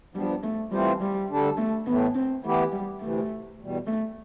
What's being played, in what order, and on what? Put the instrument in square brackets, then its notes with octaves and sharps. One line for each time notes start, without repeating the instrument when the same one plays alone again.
[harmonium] G2 F3 B3 D4 [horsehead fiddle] G3
[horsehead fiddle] A3
[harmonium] E3 A3 C4 F4 C5 [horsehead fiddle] G3
[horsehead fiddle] G3
[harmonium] D2 D3 G3 D4 A4
[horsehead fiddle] A3
[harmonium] A2 E3 A3 [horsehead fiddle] B3
[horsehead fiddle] C4
[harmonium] E3 B3 E4 G4 [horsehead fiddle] A3
[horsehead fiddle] G3
[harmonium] D2 C3 E3 [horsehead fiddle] A3
[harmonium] E2 B2 G3
[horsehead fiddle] A3